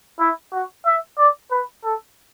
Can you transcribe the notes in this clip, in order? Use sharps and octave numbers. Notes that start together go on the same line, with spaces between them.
E4
F#4
E5
D5
B4
A4